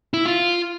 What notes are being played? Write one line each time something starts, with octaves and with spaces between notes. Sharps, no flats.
E4
F4